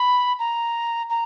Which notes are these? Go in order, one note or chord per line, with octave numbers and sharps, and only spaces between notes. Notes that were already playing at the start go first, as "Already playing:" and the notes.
Already playing: B5
A#5
A#5